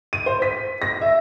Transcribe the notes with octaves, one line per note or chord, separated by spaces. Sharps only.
D#7
C5
B6
A#6
E5